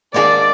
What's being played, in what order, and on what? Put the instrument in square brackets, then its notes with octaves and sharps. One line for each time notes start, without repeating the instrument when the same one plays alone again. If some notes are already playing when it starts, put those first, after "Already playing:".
[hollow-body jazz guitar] G#2 D#3 A#3 D4 G#4 [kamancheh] D5